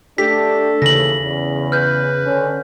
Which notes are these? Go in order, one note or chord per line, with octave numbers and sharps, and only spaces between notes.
A3 D4 G4 A4 B6
D#2 C#3 E3 A#6 F#7
E2
B4 F6 G6
D3 C#4